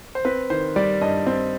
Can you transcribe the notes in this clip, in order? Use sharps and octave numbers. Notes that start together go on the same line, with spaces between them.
C5
C4 B4
D#3 C5
G3 D5
G2 D#5
C4